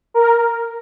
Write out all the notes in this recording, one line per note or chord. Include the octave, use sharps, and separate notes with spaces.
A#4